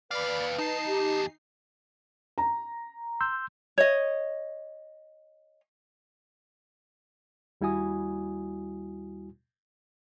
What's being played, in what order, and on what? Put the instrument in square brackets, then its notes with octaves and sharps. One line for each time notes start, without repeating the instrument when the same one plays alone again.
[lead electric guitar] D#2 F5 [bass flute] B4 [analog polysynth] D5 B5
[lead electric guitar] E2 A5 [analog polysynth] D#4 C7
[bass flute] G4
[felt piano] A#5
[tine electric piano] C6 E6 G6
[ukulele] C#5 D#5
[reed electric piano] D#2 G3 E4 F#4 G#5 D#6